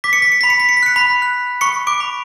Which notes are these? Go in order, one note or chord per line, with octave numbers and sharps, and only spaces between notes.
D6 B6
C#7
B6
C#7
B5 B6
C#7
B6
C#7
B6
F#6 C#7
B5 B6
F#6
B5 C#6 C#7
D6 D7
B5